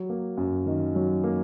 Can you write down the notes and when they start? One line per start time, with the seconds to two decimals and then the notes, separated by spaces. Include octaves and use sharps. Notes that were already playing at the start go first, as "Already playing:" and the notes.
Already playing: F#3
0.09 A#3
0.37 F#2
0.66 D#3
0.95 F#3
1.24 A#3